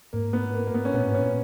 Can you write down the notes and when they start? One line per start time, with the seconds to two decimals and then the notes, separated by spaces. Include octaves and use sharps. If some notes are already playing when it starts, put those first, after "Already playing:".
0.13 G#2 A#3
0.33 B3
0.54 A#3
0.67 A#3
0.74 B3
0.85 C#4
0.94 A#2 B3
1.07 G#2
1.15 C#4
1.21 A#2